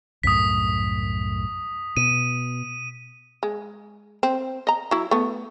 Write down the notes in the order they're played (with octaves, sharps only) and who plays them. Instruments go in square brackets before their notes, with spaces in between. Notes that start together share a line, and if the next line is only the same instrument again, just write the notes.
[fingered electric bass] C2 F#2 A2 [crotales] D#6 B6
[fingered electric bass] B2 [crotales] D#7
[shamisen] G#3
C4
D#5 A#5
F#3 E4
A3 B3